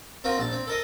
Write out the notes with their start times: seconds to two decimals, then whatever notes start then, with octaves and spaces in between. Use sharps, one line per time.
0.24 C4 F4 F#4 A#4
0.38 A#1 A5
0.52 C4
0.67 A4 A#4 D#5